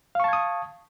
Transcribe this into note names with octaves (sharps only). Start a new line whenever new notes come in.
F5 A5 C#6 D#6 G#6